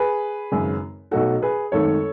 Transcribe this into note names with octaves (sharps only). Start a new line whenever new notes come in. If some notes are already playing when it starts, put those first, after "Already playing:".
Already playing: G#4 B4
G#1 F#2 C#3
B1 B2 F#3 A3 F#4 A4
G#4 B4
G#1 F#2 D#3 A3 A4 C#5